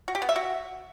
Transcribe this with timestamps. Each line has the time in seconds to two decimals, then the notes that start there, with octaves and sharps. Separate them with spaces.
0.08 F#4
0.15 G4
0.22 B3
0.29 E5
0.36 F#4